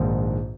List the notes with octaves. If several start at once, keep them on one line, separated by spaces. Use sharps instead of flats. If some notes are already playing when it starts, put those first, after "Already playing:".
Already playing: A#1 G#2 D#3